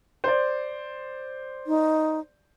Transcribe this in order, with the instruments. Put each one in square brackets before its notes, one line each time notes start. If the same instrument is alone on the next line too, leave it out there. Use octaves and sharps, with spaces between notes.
[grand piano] C5 D5
[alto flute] D#4